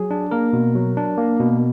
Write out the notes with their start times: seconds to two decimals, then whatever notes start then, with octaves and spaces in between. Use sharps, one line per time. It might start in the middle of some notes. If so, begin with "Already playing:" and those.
Already playing: F#3 G#4
0.11 D4
0.31 A#3 A#4
0.53 B2
0.75 F#3
0.97 D4
1.17 A#3
1.40 B2